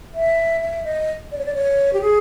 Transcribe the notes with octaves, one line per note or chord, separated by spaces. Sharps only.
E5
E5
D#5
D5
C#5
D5
C#5
G4
G#4